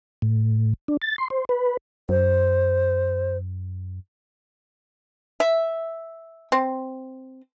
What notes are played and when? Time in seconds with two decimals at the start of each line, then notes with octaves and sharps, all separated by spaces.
0.22 A2
0.88 D4
1.02 A6
1.18 C6
1.30 C5
1.49 B4
2.09 F#2 C5
5.40 E5
6.52 C4